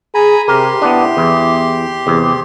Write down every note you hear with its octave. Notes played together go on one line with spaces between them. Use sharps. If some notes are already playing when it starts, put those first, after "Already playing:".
G#4 G#5 A#5 B5
C3 G4 A#4 C6
B3 D4 E4
E2
E2 C3